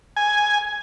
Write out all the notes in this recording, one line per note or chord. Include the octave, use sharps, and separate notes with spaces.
G#5